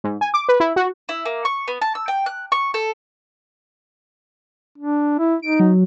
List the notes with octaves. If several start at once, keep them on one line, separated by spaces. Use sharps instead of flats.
G#2
G#5
D6
B4
E4
F#4
E4
A#3
C#6
B3
A5
E6
G5
F#6
C#6
A4
D4
E4
D#4 D7
F#3